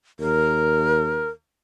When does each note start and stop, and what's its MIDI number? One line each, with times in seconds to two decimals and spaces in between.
0.20 1.30 39
0.20 1.29 70